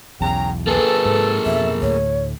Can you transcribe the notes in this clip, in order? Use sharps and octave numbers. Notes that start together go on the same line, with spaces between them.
B1 E2 C#3 G5 A#5
A#3 G#4 A4 B4
G#2
F2 B2 E5
D2 A2 A3 C#5